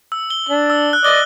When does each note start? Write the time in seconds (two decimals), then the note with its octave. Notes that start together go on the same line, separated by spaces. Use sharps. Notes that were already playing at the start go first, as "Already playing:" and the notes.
0.12 E6
0.30 G7
0.49 D4
0.70 E6
0.93 F#6
1.04 D5 D#5 G7